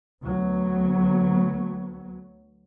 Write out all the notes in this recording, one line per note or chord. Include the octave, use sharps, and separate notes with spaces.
D2 F#3 B3